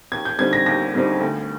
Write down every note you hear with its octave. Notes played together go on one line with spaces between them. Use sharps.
D#2 G#6
G6
D3 G3 C4 D#4 G#6
A#6
D#2 A#6
D3 G3 C4 D#4
D2